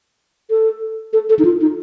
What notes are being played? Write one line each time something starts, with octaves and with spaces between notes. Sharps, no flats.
A4
A4
A4
D#4
F4
D#4